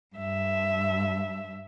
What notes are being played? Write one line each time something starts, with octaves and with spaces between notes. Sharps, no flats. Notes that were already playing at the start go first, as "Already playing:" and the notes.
G2 E5